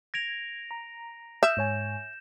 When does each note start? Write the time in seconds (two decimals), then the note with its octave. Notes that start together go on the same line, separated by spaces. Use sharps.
0.14 G#6 A#6 D7 F7
0.71 A#5
1.43 E5 D#6 F6 G6 E7
1.57 G#2 C#5 G#5